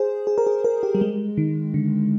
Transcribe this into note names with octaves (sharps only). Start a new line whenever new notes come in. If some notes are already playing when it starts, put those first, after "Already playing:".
Already playing: G#4 C5
G#4
A#4
G#4
A#4
G4
G3
G#3
D#3
D3